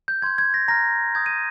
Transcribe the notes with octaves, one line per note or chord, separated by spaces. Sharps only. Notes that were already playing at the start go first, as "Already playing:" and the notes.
G6
C6 G6 G#6
G#6
A#6
A#5 F6 A#6
A#5 D#6 G6 G#6
D#7